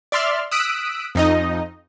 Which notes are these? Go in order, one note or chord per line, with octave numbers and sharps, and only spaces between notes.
D5 E5 C6 F6
D#6 E6 F#6 B6 D7
F2 D#4 D#5